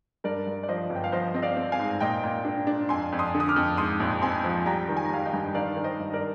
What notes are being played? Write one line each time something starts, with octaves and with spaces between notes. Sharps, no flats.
G2 A#4 D5
G2
D5
F3 C5 D#5
G1
G5
F5
F3 C5 D#5
C4 D#5
D5 F5
C4
F5 G#5
G#2
A#2 D#5 G5
A#2
D4
D4
F2 G#5 C6
F2
C6 D#6
D3
D#6
D6 F6
F2
G#2 C6 D#6
A#1
C4 G#5 C6
F3
G3 G5 A#5
D#3
G#5
A#5
G3 F5 G#5
D#5 G5
G2
D#3 D5 F5
D#3
C5 D#5
G2
D#5
A#4 D5